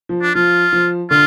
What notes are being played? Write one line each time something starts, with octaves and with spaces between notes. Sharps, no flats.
F3
D4
F3 F4
F3
D3 F4